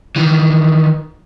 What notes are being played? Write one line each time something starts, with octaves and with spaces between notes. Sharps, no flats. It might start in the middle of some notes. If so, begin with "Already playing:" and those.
D#3 E3